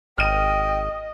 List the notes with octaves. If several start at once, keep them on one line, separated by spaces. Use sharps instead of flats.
G#1 D#5 G5 F6 D#7